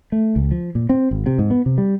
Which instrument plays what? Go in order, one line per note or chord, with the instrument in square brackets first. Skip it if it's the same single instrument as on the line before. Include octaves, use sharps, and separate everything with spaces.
[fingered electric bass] A3
C#2
F3
A#2
C4
G#1
C3
G#2
B3
C3
G3